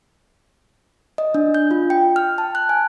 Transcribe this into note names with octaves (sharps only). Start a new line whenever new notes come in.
D#5
D4
G6
F4
G5
F6
A5
F#6
G#5